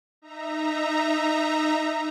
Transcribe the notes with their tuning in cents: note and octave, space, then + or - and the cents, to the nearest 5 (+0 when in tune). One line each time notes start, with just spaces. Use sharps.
D#4 -15 E5 +0 A#5 +0